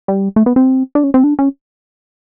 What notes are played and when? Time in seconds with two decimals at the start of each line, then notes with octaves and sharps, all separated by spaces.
0.08 G3
0.36 A3
0.46 B3
0.56 C4
0.95 D4
1.04 C#4
1.14 C4
1.24 D4
1.39 C#4